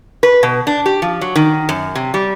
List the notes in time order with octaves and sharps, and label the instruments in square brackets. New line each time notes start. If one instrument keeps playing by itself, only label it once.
[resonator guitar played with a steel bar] B4
B2
D4
G4
F3
F#3
D#3
F#2
C3
G3